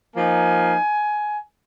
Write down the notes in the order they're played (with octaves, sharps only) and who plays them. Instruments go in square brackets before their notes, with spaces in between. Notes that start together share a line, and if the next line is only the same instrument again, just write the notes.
[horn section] F3 A#3 D#4 G#5